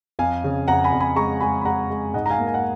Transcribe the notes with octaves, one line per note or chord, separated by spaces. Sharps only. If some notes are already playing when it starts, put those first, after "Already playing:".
F2 F5 G#5
C#3
F2 F#5 A#5
G#5 B5
F2
G#5 B5
G#3 A#5 C#6
G#3 G#5 B5
B5
G#3 F#5 A#5
G#3
G#2 D#5 F#5
A#5
F5 G#5
A#3
G#5
F#5